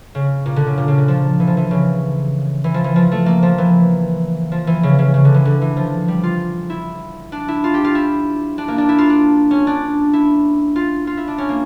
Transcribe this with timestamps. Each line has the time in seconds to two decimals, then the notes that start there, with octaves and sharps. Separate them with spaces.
0.15 C#3
0.46 A#2
0.56 D3
0.67 C#3
0.78 A#2
0.88 C#3
0.98 D3
1.08 F3
1.40 E3
1.48 F3
1.57 E3
1.71 C#3
2.64 E3
2.74 F3
2.84 E3
2.96 F3
3.11 A3
3.26 A#3
3.43 F3
3.58 E3
4.52 F3
4.67 E3
4.83 C#3
4.99 C#3
5.14 C#3
5.25 D3
5.34 E3
5.45 D3
5.61 E3
5.77 F3
6.08 G3
6.23 F4
6.70 E4
7.32 D4
7.48 E4
7.64 F4
7.74 G4
7.84 F4
7.95 E4
8.58 D4
8.68 A#3
8.78 D4
8.89 E4
8.98 F4
9.10 D4
9.51 C#4
9.67 D4
10.13 E4
10.76 F4
11.07 F4
11.17 E4
11.28 D4
11.38 C#4
11.49 A#3